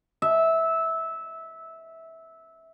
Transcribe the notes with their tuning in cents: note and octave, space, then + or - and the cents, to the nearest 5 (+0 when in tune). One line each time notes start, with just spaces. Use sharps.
E5 -15